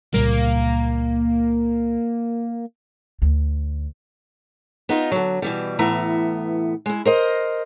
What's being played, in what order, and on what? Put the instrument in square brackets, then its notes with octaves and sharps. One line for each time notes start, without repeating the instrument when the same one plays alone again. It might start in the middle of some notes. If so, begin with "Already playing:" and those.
[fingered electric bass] C#2 A#2 G3 [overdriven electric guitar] A#3
[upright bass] D2
[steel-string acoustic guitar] B3 D#4 F4
D3 F#3
B2 E3 G3
A2 E3 B3 E5 A#5
G#3 E4
A#4 C5 D#5